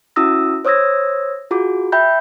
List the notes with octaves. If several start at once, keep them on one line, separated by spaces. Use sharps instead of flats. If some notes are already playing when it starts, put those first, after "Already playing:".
C#4 E4 F#4 D#6 E6 A#6
C5 C#5 D#6 E6 G#6 A#6
F4 F#4 G#4 D6
E5 G5 B5 G6